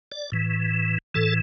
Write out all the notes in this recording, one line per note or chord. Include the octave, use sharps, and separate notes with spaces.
D5
A2 E3
A2 E3 A4